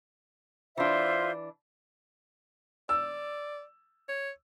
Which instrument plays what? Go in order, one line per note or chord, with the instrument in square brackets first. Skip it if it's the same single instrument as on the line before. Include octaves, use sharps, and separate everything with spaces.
[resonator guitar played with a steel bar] E3 D4 [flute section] F4 C5 E5
[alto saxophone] D5 [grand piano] E6
[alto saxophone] C#5